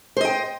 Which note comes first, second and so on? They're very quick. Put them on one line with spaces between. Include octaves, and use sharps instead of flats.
C5 D#5 G5